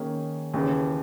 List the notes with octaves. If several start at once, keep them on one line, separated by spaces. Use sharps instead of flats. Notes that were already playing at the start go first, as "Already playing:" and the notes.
Already playing: D#3 A#3 C#4 G#4
D#2 C#3 E3